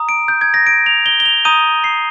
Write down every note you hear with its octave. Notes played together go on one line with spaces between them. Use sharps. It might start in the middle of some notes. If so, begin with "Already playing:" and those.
Already playing: A#5 D#6
D7
G6
G#6
A#6
D7
F7
G7
G7
F7
A#5 D#6 G6 D#7
C7